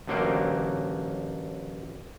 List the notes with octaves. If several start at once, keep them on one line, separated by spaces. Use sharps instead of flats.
A1 D3 F#3 A#3 C5 G5